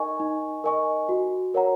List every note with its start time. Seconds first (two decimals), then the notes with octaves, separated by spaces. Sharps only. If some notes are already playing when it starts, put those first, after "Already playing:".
Already playing: D#4 A#4 D#5 G#5 C#6
0.20 D#4
0.64 A#4 D#5 G#5 C#6
1.09 F#4
1.54 A#4 C#5 F#5 A#5